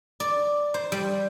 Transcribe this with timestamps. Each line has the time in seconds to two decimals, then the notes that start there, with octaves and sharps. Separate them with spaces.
0.20 D5
0.74 C5
0.92 G3